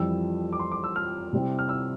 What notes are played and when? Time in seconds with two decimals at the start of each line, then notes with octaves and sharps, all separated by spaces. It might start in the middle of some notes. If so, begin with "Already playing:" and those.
Already playing: F2 E3 G3 E6
0.53 D6
0.59 C6
0.72 D6
0.84 E6
0.96 F6
1.33 C3 G3 C4 E4
1.59 F6
1.69 E6